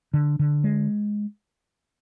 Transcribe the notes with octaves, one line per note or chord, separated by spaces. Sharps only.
D3
D3
G#3